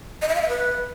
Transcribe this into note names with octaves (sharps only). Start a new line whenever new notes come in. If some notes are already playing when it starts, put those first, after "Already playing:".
D#5
E5
F5
E5
B4